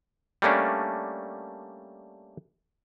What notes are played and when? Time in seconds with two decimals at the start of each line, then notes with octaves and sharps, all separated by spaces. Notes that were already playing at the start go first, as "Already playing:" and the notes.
0.42 G3 A3 A#3 C#4 D4